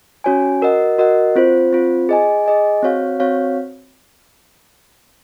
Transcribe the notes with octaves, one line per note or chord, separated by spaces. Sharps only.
C#4 F#4 C#5 G#5
F#4 A#4 D#5 F#5
F#4 A#4 D#5 F#5
C4 F4 C5
C4 F4 C5
G#4 D#5 G#5
G#4 D#5 G#5
C4 F#4 C#5 F5
C4 F#4 C#5 F5